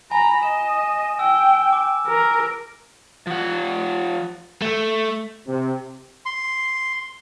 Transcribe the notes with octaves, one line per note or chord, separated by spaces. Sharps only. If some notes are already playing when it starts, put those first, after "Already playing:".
G#5 A#5 B5
D#5 E7
G5 E6
D6
A#4
F3 F#5
A3
C3
C6